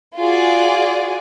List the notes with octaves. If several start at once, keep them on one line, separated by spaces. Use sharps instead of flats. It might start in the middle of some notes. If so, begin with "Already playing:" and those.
F4 F#4 G#4 D5